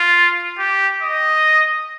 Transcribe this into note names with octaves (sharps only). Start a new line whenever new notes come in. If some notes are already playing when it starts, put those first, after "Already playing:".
Already playing: F4
G4
D#5